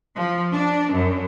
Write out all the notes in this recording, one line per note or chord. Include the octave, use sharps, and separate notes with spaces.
F3
D4
F#2